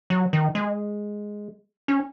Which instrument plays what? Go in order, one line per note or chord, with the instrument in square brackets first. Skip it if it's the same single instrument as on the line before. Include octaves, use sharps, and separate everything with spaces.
[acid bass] F#3
D#3
G#3
C#4